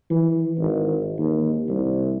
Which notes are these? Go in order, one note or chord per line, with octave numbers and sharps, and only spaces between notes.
E3
G#1
D#2
C2